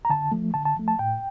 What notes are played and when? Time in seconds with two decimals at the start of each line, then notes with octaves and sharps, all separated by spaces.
0.05 A#5
0.10 D3 A5
0.32 F3 A3
0.54 D3 A5
0.65 A5
0.77 F3 A3
0.88 A5
0.99 A2 G5